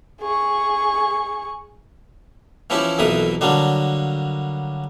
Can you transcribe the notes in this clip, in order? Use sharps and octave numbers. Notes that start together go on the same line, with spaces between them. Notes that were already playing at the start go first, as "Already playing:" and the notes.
G#4 C#6
E3 F3 C#4 E4 G4
B1 F2 E3 A#3 E5 D#6
D3 F#3 G3 A#3 D4